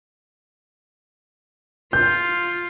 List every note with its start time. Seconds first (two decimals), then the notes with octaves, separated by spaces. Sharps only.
1.93 F4 G6